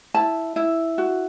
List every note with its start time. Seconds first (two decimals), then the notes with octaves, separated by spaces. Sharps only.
0.14 E4 A5
0.56 E4
0.98 F#4